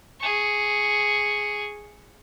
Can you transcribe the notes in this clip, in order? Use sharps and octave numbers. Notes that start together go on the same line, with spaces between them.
G#4 C#6